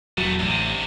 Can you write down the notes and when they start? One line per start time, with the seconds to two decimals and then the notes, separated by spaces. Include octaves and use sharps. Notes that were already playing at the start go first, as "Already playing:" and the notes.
0.18 E1 A#2 F#3 A3
0.40 A1 D2 C3